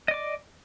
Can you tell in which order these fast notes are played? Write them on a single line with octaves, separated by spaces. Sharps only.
D#5 D5 D6